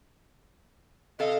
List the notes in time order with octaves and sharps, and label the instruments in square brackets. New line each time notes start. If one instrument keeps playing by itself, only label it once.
[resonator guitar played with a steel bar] C3 A4 F5 [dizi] D#5